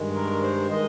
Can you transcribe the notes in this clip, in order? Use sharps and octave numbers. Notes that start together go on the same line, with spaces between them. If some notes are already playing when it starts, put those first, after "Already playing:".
Already playing: G2 D#3 G#3
A#4
C5
D#3 G#3 D#5